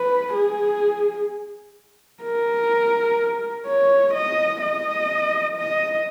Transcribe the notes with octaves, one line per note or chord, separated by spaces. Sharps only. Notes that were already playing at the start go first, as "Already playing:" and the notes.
Already playing: B4
G#4
A#4
C#5
D#5
D#5
D#5